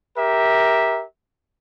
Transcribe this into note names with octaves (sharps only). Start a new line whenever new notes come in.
G4 A#4 E5